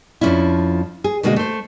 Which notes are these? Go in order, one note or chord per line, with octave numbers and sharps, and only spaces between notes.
F2 F3 F#3 C#4 D4 E4
G#4
B2 D3 G#3 A#3 F#4 D#5
A3 C5